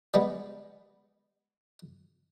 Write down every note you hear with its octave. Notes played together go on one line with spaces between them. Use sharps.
G3 G#3 B3